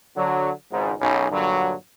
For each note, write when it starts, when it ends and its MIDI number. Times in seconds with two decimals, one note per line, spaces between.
0.16 0.51 50
0.16 0.51 54
0.72 0.93 32
0.72 0.93 37
0.72 0.93 44
1.01 1.27 35
1.01 1.27 42
1.01 1.27 61
1.01 1.27 63
1.01 1.27 68
1.32 1.74 43
1.32 1.74 46
1.32 1.74 50
1.32 1.74 54